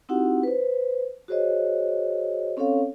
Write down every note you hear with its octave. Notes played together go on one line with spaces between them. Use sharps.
C4 D#4 E4 F#4 G4 F#5
B4 C5
F#4 G#4 C5 C#5 D#5
C4 C#4 A4 C#5 F5